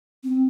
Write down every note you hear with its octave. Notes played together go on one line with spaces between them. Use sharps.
C4